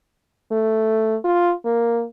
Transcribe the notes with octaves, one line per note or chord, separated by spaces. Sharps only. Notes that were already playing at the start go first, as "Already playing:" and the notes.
A3
F4
A#3